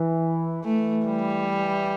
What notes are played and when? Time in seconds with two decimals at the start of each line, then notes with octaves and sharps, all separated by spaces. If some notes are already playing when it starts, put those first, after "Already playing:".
Already playing: E3
0.64 E3 A3
1.06 G3